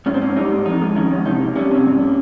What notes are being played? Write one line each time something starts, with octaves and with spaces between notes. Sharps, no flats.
G#2 C#4
C4
A#3 C#4
G3 D#4
G#2
F2 D#4
G#3
D#3 C#4
F2 C#4
C3 D#4
A#3
G3 C#4
C3 C#4
G2
A#3